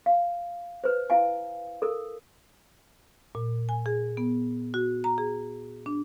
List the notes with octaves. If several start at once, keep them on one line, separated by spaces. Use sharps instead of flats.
F5
B4 C5
E4 F5 G#5
A4 A#4
A#2
G#5
G#4
B3
F#4
A#5
G#4
D4